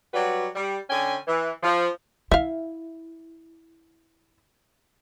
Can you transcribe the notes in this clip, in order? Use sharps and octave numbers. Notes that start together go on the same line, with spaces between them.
F#3 G3 F#4 B4 D5
G3
D3 C#4 G5 G#5
E3
F3
E4 E5 F5